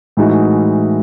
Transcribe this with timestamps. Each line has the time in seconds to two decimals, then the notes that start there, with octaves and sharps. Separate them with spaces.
0.17 A2 E3 G#3 D#4 F#4